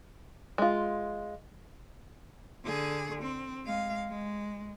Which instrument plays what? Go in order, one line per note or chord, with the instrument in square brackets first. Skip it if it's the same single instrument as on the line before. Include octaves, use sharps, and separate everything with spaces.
[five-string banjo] G#3 F4
[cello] D3 G#4
C4
G#3 F5
G#3